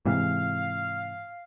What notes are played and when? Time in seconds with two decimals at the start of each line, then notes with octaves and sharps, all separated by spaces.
0.05 G#2 C3 E3 F5